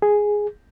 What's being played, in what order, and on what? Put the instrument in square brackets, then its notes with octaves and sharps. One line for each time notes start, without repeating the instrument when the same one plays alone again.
[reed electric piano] G#4